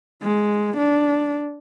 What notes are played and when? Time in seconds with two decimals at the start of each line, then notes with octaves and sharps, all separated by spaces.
0.22 G#3
0.77 D4